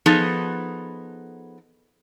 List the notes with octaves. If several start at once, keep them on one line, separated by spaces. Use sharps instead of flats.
F3 B3 D#4 G#4 A4